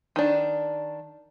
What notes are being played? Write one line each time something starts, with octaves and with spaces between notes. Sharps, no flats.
D#3 D4